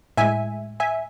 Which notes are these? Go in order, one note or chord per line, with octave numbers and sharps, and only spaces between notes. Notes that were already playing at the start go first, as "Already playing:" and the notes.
A2 G#3 E5 G#5
E5 G#5